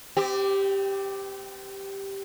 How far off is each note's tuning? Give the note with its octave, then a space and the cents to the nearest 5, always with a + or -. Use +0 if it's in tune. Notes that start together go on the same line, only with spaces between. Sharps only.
C4 -35 G4 +0